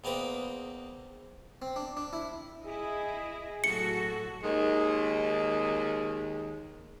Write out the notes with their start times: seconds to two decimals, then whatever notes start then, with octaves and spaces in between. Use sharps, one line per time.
0.04 E2 A#3 C4 B4 D#5
1.62 C4
1.76 D4
1.97 D4
2.13 E4
2.65 E4 G#4 D#5
3.64 A2 F#3 F#4 A4 C#7
4.43 D#2 D#3 G#3